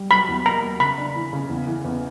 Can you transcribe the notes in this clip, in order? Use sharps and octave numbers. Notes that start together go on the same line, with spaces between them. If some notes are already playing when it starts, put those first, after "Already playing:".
Already playing: G3
F#3 B5
E2
A#3 A#5
F#3
C#3 B5
D4
E3
C#3
E2
E3
E2